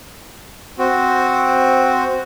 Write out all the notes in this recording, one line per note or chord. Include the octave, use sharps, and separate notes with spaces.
C4 F#4